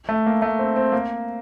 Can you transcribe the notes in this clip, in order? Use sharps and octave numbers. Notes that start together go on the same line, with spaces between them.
A3
A#3
A3
C4
C4
A#3